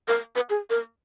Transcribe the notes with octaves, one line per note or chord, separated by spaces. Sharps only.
A#4
B4
G#4
A#4